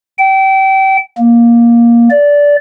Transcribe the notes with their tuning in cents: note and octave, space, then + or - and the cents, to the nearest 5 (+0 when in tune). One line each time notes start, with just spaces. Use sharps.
G5 -30
A#3 +10
D5 -15